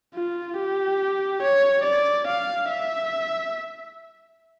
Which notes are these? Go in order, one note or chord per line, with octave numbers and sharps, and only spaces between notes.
F4
G4
C#5
D5
F5
E5